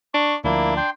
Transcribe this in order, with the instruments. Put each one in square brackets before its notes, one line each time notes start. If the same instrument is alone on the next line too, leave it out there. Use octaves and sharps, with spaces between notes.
[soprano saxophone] D4 [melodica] C#6
[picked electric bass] D2 F3 [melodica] A#3 E4 [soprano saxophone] D4
[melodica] G5 C6